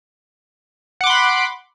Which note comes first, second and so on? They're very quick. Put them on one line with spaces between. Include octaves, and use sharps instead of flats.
F#5 D6 C6 B5